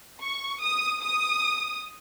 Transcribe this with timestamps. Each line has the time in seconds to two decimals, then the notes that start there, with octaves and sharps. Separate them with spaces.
0.21 C#6
0.62 D#6
1.02 D#6